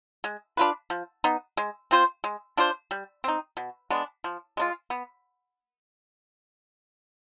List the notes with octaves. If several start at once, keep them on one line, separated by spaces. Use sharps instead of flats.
G#3
D4 F4 B4
F3
B3 D#4
G#3
C4 F4 C5
G#3
D4 F4 C5
G3
C4 D#4
B2
G#3 B3 D4
F3
G#3 D4 F4
B3